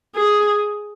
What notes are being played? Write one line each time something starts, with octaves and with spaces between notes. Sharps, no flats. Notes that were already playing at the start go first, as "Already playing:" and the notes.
G#4